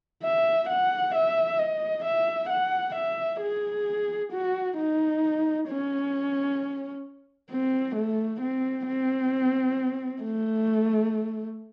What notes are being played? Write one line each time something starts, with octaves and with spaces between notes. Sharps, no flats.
E5
F#5
E5
D#5
E5
F#5
E5
G#4
F#4
D#4
C#4
C4
A3
C4
C4
A3